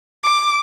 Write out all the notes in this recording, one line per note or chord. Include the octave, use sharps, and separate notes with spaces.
D6